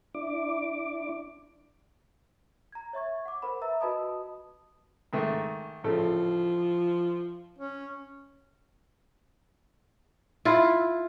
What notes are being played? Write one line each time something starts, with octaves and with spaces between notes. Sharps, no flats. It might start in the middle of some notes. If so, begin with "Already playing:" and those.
D4 E4 D6
A#5 G#6
C#5 E5 C#6 G#6
F#5 D6
A#4 C5 F#5 B5
B4 E5 A#5 E6
F#4 B4 D#5 A5 B5 D#6
G#2 D#3 A3
A1 C#3 F3 A4
C#4
E4 F4